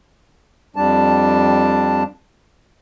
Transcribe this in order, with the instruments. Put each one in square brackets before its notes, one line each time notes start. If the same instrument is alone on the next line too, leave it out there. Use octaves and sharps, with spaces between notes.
[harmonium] F2 G3 D4 A5